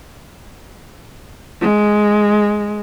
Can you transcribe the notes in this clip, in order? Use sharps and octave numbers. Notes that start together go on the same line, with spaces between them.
G#3